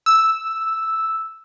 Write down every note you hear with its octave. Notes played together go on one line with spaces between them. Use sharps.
E6